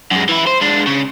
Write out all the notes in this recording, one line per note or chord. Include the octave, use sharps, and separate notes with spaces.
F#2 G#3
E3 E4
C5
G#3 D4
C#3